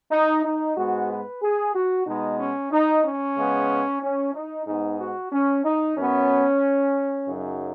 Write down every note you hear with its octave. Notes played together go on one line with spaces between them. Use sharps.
D#4
D#4
G#2 G#3 B3 F#4
B4
G#4
F#4
B2 G#3 B3 D#4
C#4
D#4
C#4
C#3 G#3 B3
C#4
D#4
G#2 G#3 B3 D#4
F#4
C#4
D#4
F#2 F#3 B3 C#4
F#2 C#3 F#3 D#4